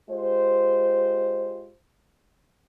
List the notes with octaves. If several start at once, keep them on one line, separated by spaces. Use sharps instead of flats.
G#3 F4 G4 C5